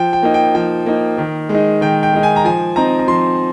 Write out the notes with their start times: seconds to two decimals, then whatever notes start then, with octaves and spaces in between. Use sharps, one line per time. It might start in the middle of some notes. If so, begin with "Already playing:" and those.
Already playing: F3 G5
0.13 G5
0.23 A#3 D#4
0.34 G5
0.55 F3 G5
0.86 A#3 D#4
1.18 D#3
1.49 G#3
1.54 D#4
1.81 D#3 G5
2.03 G5
2.13 G#3 D#4
2.23 G#5
2.36 A#5
2.45 F3 G#5
2.76 C4 D#4 A#5
2.99 A#5
3.08 F3 C6